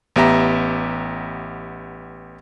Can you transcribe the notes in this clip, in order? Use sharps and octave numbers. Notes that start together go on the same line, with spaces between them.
A1 B3 G4 E5 A#5